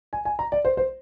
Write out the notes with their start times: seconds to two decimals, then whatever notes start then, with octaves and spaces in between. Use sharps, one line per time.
0.13 G#5
0.25 G#5
0.39 A#5
0.52 D5
0.65 C5
0.77 C5